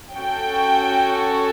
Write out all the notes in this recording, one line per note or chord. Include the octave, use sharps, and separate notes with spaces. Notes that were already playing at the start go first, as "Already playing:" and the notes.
C#4 F#4 A4 G5